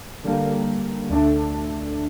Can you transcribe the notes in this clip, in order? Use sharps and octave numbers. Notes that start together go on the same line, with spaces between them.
D3 G3 A#3
D2 D3 A3 D4